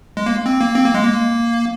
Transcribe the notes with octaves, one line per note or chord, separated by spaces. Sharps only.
G#3
A#3
C4
A#3
C4
A#3
G#3
A#3